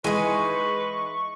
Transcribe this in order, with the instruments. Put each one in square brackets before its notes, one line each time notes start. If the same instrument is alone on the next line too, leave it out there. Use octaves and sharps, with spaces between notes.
[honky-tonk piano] E3 G#3 [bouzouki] D#4 G#5 [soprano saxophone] B4 [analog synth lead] C#6